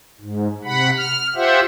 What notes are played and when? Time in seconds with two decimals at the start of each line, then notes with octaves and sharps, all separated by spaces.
0.20 G#2
0.65 C3 F#5 B5
0.97 F6
1.35 F4 G4 C5 E5 F#5